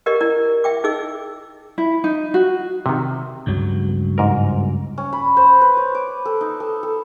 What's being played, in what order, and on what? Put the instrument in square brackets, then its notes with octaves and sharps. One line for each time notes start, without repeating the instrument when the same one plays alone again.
[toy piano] G4 A#4 D5 D#5 C#6
E4 A#4 D5
E5 G5 D6
D#4 G#4 D#5 D6 E6
[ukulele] E4
D#4
F#4
[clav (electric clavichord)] C3 D#3
[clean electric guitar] C#2 G2 F#3
[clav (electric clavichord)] G#2 A#4
[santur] C#4
B5
C5
B4
C#5
D6
A4
D#4
A4
A4